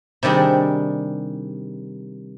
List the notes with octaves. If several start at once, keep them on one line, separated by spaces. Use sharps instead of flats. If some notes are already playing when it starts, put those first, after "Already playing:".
C3 D#3 G3 D4 G#4